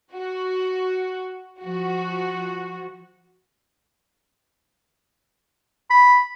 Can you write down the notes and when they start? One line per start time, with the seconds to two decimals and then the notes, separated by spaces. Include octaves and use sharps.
0.12 F#4
1.62 F3 F#4
5.90 B5